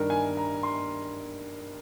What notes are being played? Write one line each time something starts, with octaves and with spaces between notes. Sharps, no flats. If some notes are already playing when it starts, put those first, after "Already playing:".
Already playing: G2 D#3 A#4
G#5
A#5
C6